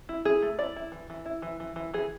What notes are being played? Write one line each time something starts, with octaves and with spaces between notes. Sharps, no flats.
E4
E4 G#4
A3
E4 D5
E4
E3
E3
E4
E3
E3
E3
E3 G#4